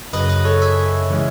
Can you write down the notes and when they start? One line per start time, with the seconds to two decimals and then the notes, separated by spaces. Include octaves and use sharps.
0.13 F#2 C#3 F#3 B4 D#5
0.29 B4 D#5
0.45 A4 C#5
0.62 E5 G#5
1.10 C#3 E3 G#3 C#4 E4